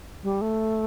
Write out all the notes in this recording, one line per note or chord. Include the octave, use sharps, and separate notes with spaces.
G3
A3